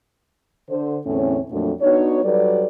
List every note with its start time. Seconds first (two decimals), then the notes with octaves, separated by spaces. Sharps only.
0.69 D3 C5
1.06 E2 A2 D3 C4 C#4
1.51 F2 A#2 F#3 A3 D4
1.81 B3 D4 D#4 F#4 C#5
2.23 F#3 G3 A4 B4 D5